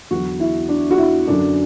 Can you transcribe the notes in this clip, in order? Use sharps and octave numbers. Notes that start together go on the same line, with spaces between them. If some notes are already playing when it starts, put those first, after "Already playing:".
E2 D3 F#3 F#4
E4
D4
F#4
E4
F#2 D3 F#3 D4